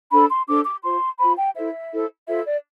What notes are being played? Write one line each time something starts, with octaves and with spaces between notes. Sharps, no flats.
D4 A4 C5 B5
C6
D4 A4 C5 D6
D6
F4 C5 C6
F4 C5 B5
G5
E4 A4 C5 E5
E4 A4 C5
F4 A4 C5 E5
D5